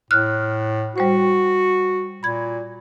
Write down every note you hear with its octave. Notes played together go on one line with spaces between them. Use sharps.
A2 F6 F#6
G3 F#4 C5 F#5
A#2 B5 G#6